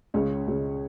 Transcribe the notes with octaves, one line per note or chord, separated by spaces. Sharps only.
C#2 C#3 G#3 C#4 C#5
C#2 C#3 G#3